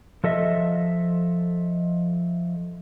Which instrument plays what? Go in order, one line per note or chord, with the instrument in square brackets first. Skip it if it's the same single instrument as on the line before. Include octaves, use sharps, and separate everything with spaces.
[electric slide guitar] F3 A4 D#5 E5